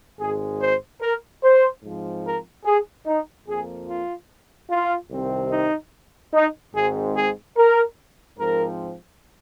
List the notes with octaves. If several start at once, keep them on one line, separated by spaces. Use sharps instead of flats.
G#1 G#2 G#3 G#4
C5
A#4
C5
G#2 F3 C4
A#4
G#4
D#4
F2 F3 A#3 G#4
F4
F4
C2 C3 D#3 C4
D#4
D#4
G#1 G#2 G#3 C4 G#4
G#4
A#4
G#2 F3 C4 A#4